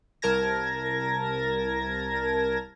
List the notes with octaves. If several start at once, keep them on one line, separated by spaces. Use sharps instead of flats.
C2 A#4 A5 G#6 A#6